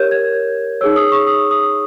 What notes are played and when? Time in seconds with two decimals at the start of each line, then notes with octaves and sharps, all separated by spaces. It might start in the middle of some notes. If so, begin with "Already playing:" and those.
Already playing: G4 A#4 C#5 G6
0.11 G#6
0.81 D#4 G#4 C#5 E6
0.96 D#6
1.12 C#6
1.27 D#6
1.51 D#6